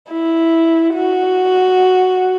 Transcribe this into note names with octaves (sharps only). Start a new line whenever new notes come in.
E4
F#4